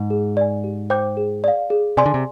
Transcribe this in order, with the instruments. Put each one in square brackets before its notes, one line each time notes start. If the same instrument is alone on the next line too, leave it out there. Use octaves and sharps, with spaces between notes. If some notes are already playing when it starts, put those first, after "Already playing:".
Already playing: [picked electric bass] G#2
[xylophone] G#4
D5 G#5
G4
C5 G5 D6 G6
G#4
D5 F5
G#4
[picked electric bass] C3 [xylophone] D5 G#5 C6
[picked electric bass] D3
C3